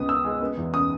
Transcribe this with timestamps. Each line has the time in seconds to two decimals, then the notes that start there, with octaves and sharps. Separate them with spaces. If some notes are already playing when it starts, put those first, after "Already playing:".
Already playing: C#2 B3 D#6
0.08 C#3 E6
0.24 G#3
0.41 B3
0.57 E2
0.73 C#3 D#6